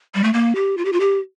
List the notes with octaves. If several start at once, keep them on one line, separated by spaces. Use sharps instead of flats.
G3
A3
A#3
G4
F4
G4
F4
G4